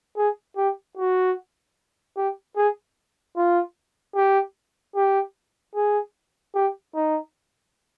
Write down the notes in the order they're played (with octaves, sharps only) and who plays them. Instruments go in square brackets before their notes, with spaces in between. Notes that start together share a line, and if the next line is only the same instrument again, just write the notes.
[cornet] G#4
G4
F#4
G4
G#4
F4
G4
G4
G#4
G4
D#4